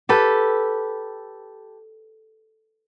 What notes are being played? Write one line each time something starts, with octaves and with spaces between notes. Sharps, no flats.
G4 A4 B4